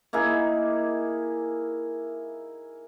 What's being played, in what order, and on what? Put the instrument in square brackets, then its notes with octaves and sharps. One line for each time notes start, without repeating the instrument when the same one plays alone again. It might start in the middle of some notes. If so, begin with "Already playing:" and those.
[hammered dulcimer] A#3 D#4 E4 G#4